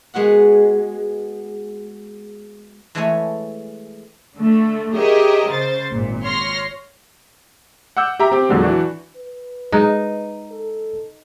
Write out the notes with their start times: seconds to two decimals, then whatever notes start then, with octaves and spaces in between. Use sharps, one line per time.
0.14 G#3 B3 F#4 F#5
2.95 E3 G#3 A3 A4 C#5 G#5
4.36 D3 A3
4.93 G4 G#4 A#4 C#5 D#5 E5
5.47 C#3 C5 A6
5.93 G#1 A#2
6.22 C#5 C6 F6 A#6
7.97 F#5 D6 E6 G6
8.20 G4 E5 A#5
8.32 C4 G4
8.49 E2 A#2 D3 F#3 G#3
8.63 E3 D4 F#4
9.16 B4
9.72 G#3 D#4
10.51 A4